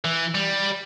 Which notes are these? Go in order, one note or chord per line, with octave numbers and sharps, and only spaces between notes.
E3
G3